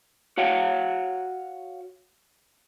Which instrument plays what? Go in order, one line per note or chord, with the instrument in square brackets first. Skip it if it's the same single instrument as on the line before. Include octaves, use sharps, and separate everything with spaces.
[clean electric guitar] F#4 C#5 F5 F#5